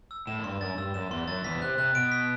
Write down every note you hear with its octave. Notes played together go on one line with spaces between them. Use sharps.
E6
A2 E7
F#2
G2 C6
F#2 A6
G2 E6
F#2 E7
E2 E3 C6
F#2 F#3 A6
E2 E3 B6
B2
C3 F#6
C3 F#6
B2 D7
B6